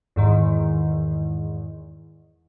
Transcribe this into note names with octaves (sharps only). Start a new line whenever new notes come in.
E2 G#2 D#3